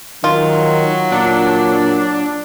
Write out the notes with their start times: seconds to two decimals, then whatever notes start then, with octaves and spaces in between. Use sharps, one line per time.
0.24 D#3 F#3 F4
1.12 A#2 D4